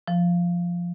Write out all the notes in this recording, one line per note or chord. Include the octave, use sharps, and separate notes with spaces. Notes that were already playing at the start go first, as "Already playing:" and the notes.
F3